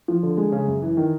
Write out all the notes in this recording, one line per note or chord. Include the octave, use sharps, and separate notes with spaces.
F3
D3
G#3
C#3
F#2
E3
D#3